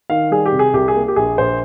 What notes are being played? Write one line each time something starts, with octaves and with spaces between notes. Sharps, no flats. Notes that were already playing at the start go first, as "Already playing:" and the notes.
D#3 F5
G3 G#4
G4
C3
G#4
C2 G4
G#4
A#3
G4
A#1 G#4
A#1 C5